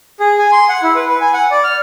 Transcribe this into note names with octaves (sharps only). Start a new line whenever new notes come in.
G#4
G#5
C6
F#5
E4
B4
B4
G#5
F#5
D5
F6